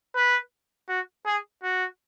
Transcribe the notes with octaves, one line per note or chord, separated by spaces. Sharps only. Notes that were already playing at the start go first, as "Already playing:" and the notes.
B4
F#4
G#4
F#4